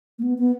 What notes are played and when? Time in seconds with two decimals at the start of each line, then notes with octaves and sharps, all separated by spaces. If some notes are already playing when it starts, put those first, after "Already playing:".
0.19 A#3
0.23 B3
0.38 B3